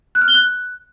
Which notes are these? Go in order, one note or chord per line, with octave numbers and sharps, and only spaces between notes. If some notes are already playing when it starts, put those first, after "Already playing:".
F#6
F6
G7
F#6